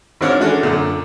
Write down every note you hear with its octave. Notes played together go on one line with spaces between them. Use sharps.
G#1 C4 D4 C#5 F6
E3 G#3 C#4 D4 F#4 A4
F#2 A#2 D3